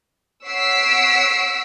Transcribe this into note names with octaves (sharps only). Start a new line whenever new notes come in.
C#5 F#5 E6 B6 C7 D7